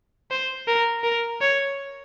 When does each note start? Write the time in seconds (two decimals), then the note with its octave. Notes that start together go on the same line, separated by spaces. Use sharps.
0.31 C5
0.67 A#4
1.04 A#4
1.41 C#5